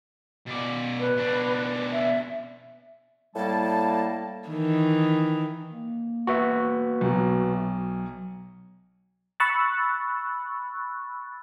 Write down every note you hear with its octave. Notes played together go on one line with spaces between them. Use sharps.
B2 D5
B4
B2 D4
E5
A2 G3 A#3 A5
D#3 E3
A#3
F#4 B4 E5 C#6
B1 B2 F#3
B5 C#6 E6 F#6 A6